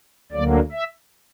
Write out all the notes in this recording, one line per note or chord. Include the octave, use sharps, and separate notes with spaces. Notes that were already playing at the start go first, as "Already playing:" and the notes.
D2 D3 F#3 A#3 D5
E5